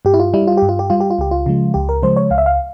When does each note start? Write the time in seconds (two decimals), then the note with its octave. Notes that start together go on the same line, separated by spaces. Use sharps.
0.05 G2 G4
0.14 E4
0.19 F4
0.34 G3 E4
0.47 F4
0.57 G2 G4
0.69 F4
0.79 G4
0.90 G3 F4
1.01 G4
1.10 F4
1.18 C#2 G4
1.31 F4
1.46 C#3 F3 G#3
1.74 C#2 G4
1.89 A#4
2.02 C#3 F3 G#3 C5
2.17 C#5
2.30 C#2 F5
2.38 E5
2.46 F5